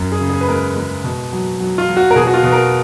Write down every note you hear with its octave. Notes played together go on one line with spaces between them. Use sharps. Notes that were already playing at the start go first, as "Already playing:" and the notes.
Already playing: F#2
G#4
C#3
G#4
B4
G#3 A#4
G#3
B2
F#3
F#3
F4
F#3
F#4
A#4
B2 G#4
F#4
F4
B2
A#4